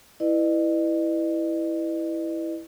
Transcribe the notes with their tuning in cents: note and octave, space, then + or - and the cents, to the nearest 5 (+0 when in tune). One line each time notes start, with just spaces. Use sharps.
E4 +0 B4 +0 D#5 -45